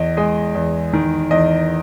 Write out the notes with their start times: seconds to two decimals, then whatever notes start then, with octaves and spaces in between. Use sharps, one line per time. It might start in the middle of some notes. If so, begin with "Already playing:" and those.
Already playing: E2 D#5
0.17 G#3 D#5
0.55 E2
0.93 D#3
1.31 E2 D#5